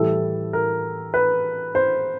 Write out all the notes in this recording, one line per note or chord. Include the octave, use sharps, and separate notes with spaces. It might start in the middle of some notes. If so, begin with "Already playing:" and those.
Already playing: A2 E3 G3 A4
A#4
B4
C5